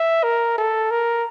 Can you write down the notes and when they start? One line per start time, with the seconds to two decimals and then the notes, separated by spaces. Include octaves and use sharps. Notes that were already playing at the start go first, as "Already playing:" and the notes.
Already playing: E5
0.24 A#4
0.58 A4
0.91 A#4